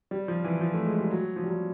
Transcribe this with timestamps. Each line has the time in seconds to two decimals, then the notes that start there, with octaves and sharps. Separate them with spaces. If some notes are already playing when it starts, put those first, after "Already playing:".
0.11 G3
0.28 F3
0.44 E3
0.61 F3
0.74 A3
0.86 G#3
0.99 G3
1.11 F#3
1.36 F3
1.44 G3
1.49 F#3